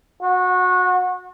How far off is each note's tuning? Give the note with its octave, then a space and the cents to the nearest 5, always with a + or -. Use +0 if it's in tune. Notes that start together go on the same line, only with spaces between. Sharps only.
F#4 -25